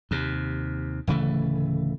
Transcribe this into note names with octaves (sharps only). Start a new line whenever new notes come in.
D#2 C3
D1 C#3 E3 A3